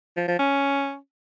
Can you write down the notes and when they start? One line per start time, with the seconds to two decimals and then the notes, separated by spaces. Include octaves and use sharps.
0.17 F3
0.28 F3
0.39 C#4